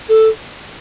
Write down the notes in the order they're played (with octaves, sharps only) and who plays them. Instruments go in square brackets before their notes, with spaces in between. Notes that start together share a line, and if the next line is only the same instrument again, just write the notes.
[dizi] A4